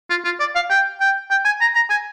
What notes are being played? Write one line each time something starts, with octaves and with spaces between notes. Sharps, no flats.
F4
F4
D5
F5
G5
G5
G5
G#5
A#5
A#5
G#5